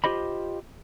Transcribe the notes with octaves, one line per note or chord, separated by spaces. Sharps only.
F4 G4 C5 D#5 B5